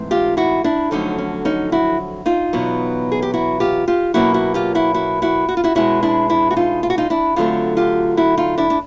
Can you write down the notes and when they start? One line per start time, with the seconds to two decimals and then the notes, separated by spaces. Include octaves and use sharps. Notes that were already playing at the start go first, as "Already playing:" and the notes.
Already playing: G#2 E3 A3 C4
0.11 F4 G4
0.37 E4 F#4
0.64 D4 E4
0.91 F2 D3 F#3 A3 C#4 D#4
1.18 C#4
1.45 C#4 D#4
1.72 E4 F#4
2.26 D#4 F4
2.53 E2 B2 F#3 B3
3.12 G#4
3.22 G4
3.34 E4 F#4
3.60 F4 G4
3.88 F4 G4
4.14 B2 F#3 A#3 C#4 E4 F#4
4.34 E4 F#4
4.54 F4 G4
4.75 E4 F#4
4.94 E4 F#4
5.22 E4 F#4
5.49 F#4
5.57 F4
5.64 E4 F#4
5.75 B2 G#3 C#4 E4 F#4
6.03 D4 E4
6.29 D4 E4
6.51 F#4
6.57 D#4 F4
6.83 F4
6.90 F#4
6.98 D#4 F4
7.10 D4 E4
7.36 D3 F#3 A3 C4 D#4 F4
7.77 F4 G4
8.17 E4 F#4
8.37 D#4 F4
8.58 D4 E4
8.70 D4